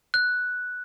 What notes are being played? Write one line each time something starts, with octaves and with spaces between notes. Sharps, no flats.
F#6